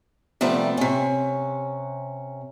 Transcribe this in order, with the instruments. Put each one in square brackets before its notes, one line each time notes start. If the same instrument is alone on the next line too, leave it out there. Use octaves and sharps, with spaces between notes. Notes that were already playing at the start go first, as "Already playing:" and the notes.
[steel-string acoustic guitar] C3 F3 G3 A3 B3
C3 C#4